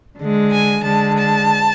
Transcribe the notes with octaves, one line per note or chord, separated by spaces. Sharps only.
D3 G#3
G#5
D3 G#3 A5
A5